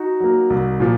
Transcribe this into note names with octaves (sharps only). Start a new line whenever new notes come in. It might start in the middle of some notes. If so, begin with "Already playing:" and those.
Already playing: D#4 F#4
F#3 A#3
C2
A#2 F3